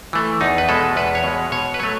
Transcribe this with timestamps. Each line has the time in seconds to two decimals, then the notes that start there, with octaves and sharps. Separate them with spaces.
0.13 E3 A3
0.41 E2 D#4
0.58 B4
0.69 B2 G#3 A4
0.96 E2 B4
1.15 C#5
1.24 B2 G#3
1.52 B2 C#5
1.74 B4
1.79 F#3 A3 C#5